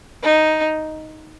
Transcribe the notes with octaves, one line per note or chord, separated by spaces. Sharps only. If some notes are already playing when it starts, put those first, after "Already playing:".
D#4